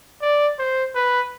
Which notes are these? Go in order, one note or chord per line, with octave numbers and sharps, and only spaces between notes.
D5
C5
B4